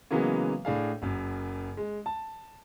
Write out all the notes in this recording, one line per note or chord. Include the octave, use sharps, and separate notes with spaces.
C#3 E3 F#3 G#3 A#3 B3
A2 D4 G#4 F5
F#1 F#2
G#3
A5